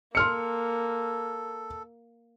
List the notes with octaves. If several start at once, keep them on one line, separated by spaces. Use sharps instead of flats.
A#3 A4 C6 F6 C#7